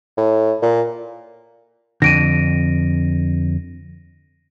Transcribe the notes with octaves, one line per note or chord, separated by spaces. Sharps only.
A2
A#2
F2 D3 A#6 D7 D#7